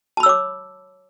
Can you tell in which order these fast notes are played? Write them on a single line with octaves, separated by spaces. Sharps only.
A5 B5 E6 C#5 D6